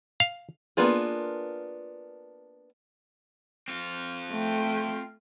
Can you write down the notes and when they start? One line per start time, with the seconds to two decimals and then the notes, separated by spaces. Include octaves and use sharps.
0.20 F5
0.77 A#3 B3 D4 F4 G#4
3.68 C4 F4
4.32 A3 G5